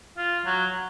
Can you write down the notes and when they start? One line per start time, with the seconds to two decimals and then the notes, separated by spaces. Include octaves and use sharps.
0.18 F4
0.46 F#3